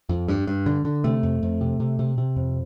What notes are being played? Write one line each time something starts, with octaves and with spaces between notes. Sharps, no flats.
F2
G2
G2
D3
D3
C3 A3
F2
F2
C3
C3
C3
C3
F2